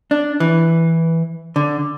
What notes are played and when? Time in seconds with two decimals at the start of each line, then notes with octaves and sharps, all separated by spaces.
0.11 D4
0.40 E3
1.56 D3